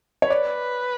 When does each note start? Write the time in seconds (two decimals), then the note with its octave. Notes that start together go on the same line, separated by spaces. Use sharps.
0.22 C#5
0.30 B4 D5